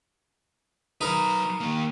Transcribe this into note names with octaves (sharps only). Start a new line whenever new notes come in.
F#3 D#4 A#4 B4
D#3 A#3